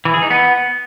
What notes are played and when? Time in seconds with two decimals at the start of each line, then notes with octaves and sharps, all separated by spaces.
0.05 E3
0.14 G#4
0.22 D#4
0.30 B3